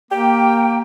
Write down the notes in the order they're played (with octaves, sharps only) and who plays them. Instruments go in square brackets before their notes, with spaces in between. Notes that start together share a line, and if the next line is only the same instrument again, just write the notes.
[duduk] A#3 [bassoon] G4 [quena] G5